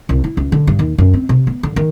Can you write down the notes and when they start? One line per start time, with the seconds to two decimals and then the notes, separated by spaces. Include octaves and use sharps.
0.09 C2
0.24 E4
0.37 C#2
0.52 D3
0.67 G2
0.79 D#2
0.98 F#2
1.13 C4
1.29 C3
1.47 B3
1.63 D3
1.76 D#3